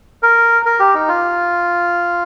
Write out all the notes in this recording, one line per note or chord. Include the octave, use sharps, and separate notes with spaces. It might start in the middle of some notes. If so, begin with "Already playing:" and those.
A#4
A#4
G4
D#4
F4